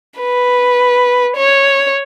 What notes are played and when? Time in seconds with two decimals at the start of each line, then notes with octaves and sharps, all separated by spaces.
0.19 B4
1.37 C#5